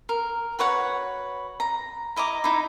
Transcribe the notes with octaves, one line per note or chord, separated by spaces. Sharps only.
A#4
F#4 B4 C#5 F#5
A#5
E4 D#5 A#5 D6
D#4 E4